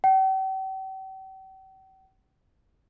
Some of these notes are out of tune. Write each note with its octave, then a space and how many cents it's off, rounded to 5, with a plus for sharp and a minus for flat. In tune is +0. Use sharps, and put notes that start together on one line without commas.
G5 -45